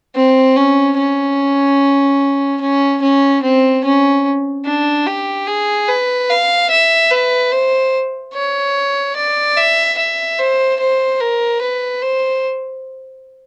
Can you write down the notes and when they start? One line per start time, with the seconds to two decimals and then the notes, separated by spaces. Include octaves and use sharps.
0.16 C4
0.57 C#4
0.98 C#4
2.61 C#4
3.02 C#4
3.43 C4
3.84 C#4
4.65 D4
5.06 G4
5.47 G#4
5.88 B4
6.29 F5
6.70 E5
7.11 B4
7.52 C5
8.34 C#5
9.16 D5
9.57 E5
9.98 E5
10.39 C5
10.80 C5
11.20 A#4
11.61 B4
12.02 C5